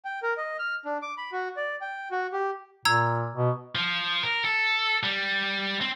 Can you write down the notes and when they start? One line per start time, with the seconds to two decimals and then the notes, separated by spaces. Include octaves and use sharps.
0.05 G5
0.23 A#4
0.37 D#5
0.59 F6
0.85 D4
1.02 D6
1.18 B5
1.32 F#4
1.57 D5
1.81 G5
2.11 F#4
2.32 G4
2.85 A#2 A#5 E6 G#6
3.36 B2
3.75 F3
4.23 A#4
4.45 A4
5.03 G3
5.81 C4